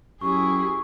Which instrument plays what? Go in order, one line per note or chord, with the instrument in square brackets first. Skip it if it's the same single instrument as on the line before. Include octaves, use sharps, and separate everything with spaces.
[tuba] F#2 [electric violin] E4 G#4 [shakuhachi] G4 [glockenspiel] C#6